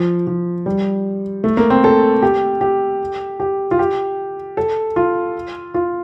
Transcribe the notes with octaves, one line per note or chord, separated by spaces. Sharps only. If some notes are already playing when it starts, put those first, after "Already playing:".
Already playing: F3
F3
G3
A3
A#3
C4
A4
G4
G4
G4
F4
G4
A4
F4
F4